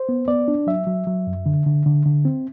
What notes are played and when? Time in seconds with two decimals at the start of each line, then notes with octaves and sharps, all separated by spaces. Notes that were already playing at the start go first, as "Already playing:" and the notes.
Already playing: C5
0.09 B3
0.28 B3 D5
0.48 D4
0.67 F#3 E5
0.87 F#3
1.07 F#3
1.27 F#2
1.46 D3
1.66 D3
1.86 D3
2.06 D3
2.25 C4